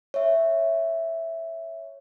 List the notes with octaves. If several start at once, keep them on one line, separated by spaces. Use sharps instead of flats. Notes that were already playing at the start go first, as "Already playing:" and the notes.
C#5 E5